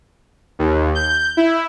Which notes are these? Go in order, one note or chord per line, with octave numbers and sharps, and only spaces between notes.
D#2
G6
E4